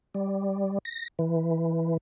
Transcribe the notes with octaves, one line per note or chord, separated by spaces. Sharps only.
G3
A#6
E3